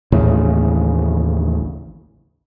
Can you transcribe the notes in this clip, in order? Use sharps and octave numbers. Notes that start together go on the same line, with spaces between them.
A1 D#2 A2 C#3